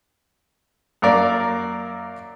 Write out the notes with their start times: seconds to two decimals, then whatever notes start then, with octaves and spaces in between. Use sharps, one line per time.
1.02 F#2 A#3 A#4 D5